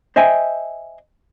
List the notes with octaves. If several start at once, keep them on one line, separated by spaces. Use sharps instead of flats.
C5 D#5 E5 G5 G#5